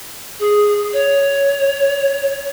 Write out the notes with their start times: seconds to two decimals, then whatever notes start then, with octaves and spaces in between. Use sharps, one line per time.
0.40 G#4
0.93 C#5